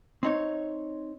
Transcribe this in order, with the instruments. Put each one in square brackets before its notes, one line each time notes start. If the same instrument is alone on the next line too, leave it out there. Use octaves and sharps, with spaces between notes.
[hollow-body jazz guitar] C4 D#4 C#5